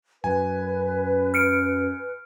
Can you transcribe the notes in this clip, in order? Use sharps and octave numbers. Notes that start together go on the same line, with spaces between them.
F#2 B4 G#5
F6 C#7 D7